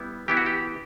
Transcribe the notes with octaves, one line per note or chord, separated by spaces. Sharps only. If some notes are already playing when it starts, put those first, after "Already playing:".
Already playing: G3 B3 E4
E3 B3 E4 G4
F#4
G4